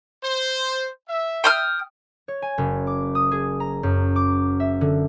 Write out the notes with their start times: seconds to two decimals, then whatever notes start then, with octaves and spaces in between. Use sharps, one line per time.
0.23 C5
1.09 E5
1.44 G5 D#6 F6
2.28 C#5
2.42 G#5
2.58 F#1
2.87 D6
3.15 D#6
3.31 G#4
3.60 A#5
3.83 F#2
4.16 D6
4.60 E5
4.81 D3